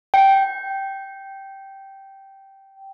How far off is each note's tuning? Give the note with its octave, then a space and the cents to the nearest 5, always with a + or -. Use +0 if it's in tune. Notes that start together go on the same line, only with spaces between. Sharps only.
G5 -10